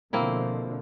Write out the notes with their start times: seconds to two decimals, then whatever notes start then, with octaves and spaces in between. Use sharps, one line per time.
0.13 B2 D3 F3 A#3 C4 E4